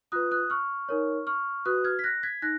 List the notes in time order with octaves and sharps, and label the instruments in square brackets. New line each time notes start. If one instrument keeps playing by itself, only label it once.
[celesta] F4 B4 D#6 F#6
D#6 F#6
C#6 F6
D#4 A#4 C#5
C#6 F6
F#4 B4 D#6 F#6
F6 G#6
B6
F#6 A#6
G#6 B6
D#4 F#6 A#6